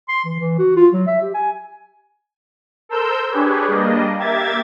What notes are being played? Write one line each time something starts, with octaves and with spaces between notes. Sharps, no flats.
C6
E3
E3
F#4
F4
F#3
E5
G4
G#5
A4 A#4 C5 E6 G6
D4 G4 G#4 B4 C#5
G3 A#3 D4 D#5
A#3 G4 E5 G#6 A6